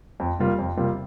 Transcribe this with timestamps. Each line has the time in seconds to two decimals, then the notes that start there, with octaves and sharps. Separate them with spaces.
0.20 F2
0.39 C3 G3 A#3 F4
0.59 F2
0.77 C3 G3 A#3 F4